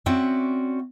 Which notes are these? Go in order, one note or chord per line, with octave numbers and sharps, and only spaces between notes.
C4 C#4 F#4 D5 E5